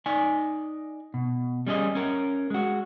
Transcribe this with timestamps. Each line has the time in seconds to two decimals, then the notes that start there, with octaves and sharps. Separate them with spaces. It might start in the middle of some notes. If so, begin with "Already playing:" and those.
0.06 D#4 D5 G#5
1.14 B2
1.67 G3 C#4 G#4 D#5
1.95 C#4 A#4
2.50 G#3 F#4